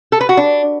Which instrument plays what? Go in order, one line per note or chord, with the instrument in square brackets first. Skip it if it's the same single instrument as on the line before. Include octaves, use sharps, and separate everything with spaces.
[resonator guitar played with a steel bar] A4
B4
F#4
D4